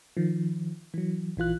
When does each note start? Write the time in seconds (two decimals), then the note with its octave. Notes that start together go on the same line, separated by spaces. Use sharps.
0.17 D#3 F3
0.94 E3 F#3
1.37 A#1 E3 F4 F#6